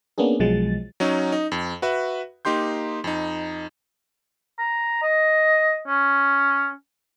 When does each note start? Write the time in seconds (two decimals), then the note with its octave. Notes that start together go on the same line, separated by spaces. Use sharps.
0.18 A#3 B3 C#4 D4 G#4
0.40 B1 B2 F3 F#3 G#3 A6
1.00 F#3 C#4 D#4
1.32 D#4
1.52 F2
1.82 F#4 B4 E5
2.45 A#3 D#4 G4 C6 G6
3.04 F2 D#4
4.59 A#5
5.02 D#5
5.87 C#4